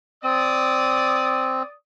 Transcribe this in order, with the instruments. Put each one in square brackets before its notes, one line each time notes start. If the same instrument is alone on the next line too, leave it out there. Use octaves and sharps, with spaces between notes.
[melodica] C4 [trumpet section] D5 D#6